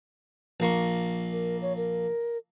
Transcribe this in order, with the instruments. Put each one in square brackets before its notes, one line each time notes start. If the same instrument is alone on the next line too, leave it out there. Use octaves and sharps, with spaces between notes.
[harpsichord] A#1 A#3 C#6
[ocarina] A#4
C#5
A#4